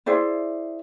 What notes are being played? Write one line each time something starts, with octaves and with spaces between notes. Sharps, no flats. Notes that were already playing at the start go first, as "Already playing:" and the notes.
E4 G#4 C5 D5